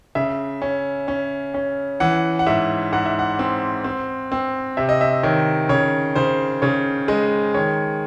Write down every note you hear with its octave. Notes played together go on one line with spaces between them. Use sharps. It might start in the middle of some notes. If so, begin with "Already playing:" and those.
C#3 E5
C#4
C#4
C#4
E3 F#5
F#5
G#2 E5
G#2 F#5
E5
F#5
C4
C4
C4
C3 E5
D#5
E5
D#3 C#5
C#3 C#5
C#3 C5
C#3 C#5
G#3 D#5
D#3 C#5